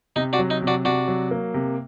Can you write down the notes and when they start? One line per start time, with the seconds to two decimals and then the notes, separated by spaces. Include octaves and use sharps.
0.16 C3 D#4
0.33 D4 F#4
0.39 F#3
0.50 D#4
0.62 C3
0.67 D4 F#4
0.85 C3 D4 F#4
1.08 F#3
1.31 A#3
1.54 C3